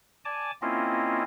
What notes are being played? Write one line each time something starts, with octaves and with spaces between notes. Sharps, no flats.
D5 G#5 A5 D6
A#3 C4 C#4 E4 F4 D#5